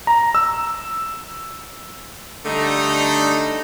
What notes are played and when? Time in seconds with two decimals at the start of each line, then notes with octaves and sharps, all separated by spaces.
0.07 A#5
0.35 E6
2.45 D3 G3 A3 D#4